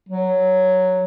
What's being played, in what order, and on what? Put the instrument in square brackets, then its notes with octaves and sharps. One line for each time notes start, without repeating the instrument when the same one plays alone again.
[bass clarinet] F#3